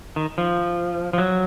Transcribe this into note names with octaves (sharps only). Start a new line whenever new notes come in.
D#3
F3
F3
F#3